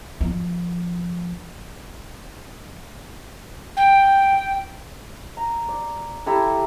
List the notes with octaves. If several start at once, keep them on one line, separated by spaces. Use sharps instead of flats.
F3
G5
A#5
D5
E4 G4 A4 A#5